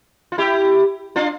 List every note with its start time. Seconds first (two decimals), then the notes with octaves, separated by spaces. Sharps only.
0.32 F4
0.38 E4 G4
1.16 D4 F4